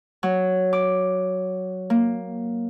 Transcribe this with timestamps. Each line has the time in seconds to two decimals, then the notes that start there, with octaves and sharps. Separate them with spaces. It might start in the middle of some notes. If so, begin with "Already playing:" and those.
0.23 F#3
0.73 D6
1.90 A#3